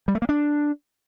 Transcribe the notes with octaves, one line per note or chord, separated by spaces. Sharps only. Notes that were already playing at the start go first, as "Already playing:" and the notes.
G3
A3
A#3
D4